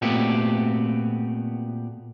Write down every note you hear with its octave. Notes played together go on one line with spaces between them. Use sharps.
A#2 A3 B3 C4 F#4 G4